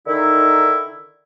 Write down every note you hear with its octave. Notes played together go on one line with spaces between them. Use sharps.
D3 D#3 D#4 E4